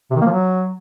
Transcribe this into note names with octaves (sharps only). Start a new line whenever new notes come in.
C3
D#3
A#3
F3
F#3